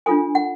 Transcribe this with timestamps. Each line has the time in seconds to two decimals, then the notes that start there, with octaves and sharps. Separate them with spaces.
0.06 D4 F4 A4 C5 G#5
0.35 F#5